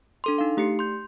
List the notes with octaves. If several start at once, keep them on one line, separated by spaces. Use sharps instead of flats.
D4 A4 C6
D#4 F5
A3 G4 C7 C#7
C6 G6